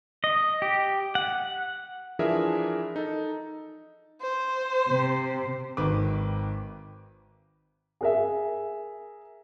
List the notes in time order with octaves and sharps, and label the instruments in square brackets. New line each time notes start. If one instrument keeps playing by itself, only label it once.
[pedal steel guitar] D#5
G4
F#5
[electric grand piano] E3 F3 D4 G#4 A#4 E5
D#4 A4
[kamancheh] C5
[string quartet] C3
[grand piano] G#1 D#3 B4 D6
[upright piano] G#4 A#4 E5